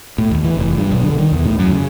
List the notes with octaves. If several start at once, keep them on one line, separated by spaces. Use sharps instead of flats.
A2
D#2
E3
F1
G2
B1
D3
D#3
E2
A2
F#2
C#3